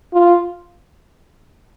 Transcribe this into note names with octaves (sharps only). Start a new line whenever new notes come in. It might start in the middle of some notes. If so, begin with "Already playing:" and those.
F4